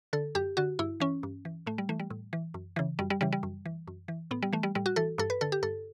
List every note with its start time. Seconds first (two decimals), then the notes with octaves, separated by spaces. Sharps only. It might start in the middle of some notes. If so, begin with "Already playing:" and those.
0.13 D3 A4
0.35 F#2 G4
0.57 D3 F#4
0.79 G2 E4
1.00 E3 C#4
1.23 G2
1.45 E3
1.66 A2 A3
1.78 G3
1.89 E3 A3
2.00 G3
2.10 A2
2.33 E3
2.54 F#2
2.76 C#3 E3
2.99 F#2 G3
3.10 G3
3.21 C#3 E3 G3
3.33 G3
3.43 F#2
3.65 E3
3.87 F#2
4.08 E3
4.31 A2 B3
4.42 G3
4.53 E3 A3
4.63 G3
4.75 A2 G3
4.86 F#4
4.96 E3 A4
5.18 G2 A4
5.30 B4
5.41 D3 A4
5.52 G4
5.63 G2 A4